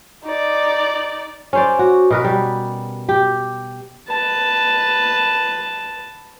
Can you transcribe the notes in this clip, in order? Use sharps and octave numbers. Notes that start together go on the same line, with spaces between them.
D#4 D5
C#4 C5 D5
F#4
B2 A#4 B4
G3
G4
B4 A5